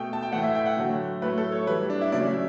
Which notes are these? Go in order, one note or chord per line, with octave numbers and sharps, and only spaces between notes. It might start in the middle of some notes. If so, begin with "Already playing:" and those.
Already playing: B2 A3 G5
A5
G5
A2 E3 A3 F#5
E5
G5
F#5
D3 F#3 A3
A2 F#3 A3 B4
A4
C#5
A2 E3 G3 B4
D4
E4
C#3 F#3 A3 D5
E5